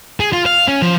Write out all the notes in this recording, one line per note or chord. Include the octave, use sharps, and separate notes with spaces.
G#4
F4
F5
C#4
F3